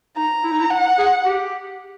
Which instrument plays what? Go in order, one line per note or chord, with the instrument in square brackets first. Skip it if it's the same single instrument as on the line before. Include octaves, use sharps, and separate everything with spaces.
[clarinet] D#4 [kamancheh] A#5
[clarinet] E4
D#4
E4
[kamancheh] F#5
[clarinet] G#4
G4